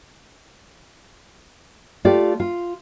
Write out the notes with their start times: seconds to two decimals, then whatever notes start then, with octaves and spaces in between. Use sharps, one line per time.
2.05 A3 F4 G4 D5 F5
2.40 F4